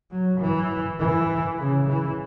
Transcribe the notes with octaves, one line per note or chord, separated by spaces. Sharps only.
F#3
E3
E3
C#3
E3